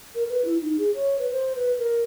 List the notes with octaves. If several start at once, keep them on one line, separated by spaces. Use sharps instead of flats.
A#4
B4
E4
D#4
G#4
C#5
B4
C5
B4
A#4